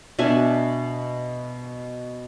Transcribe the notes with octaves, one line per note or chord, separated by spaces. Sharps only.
B2 D4 E5 G#5